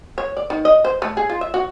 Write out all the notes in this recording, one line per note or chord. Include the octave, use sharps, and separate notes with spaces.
C#5
D5
D#3
D#5
C5
A3
G#4
F4
E5
F#4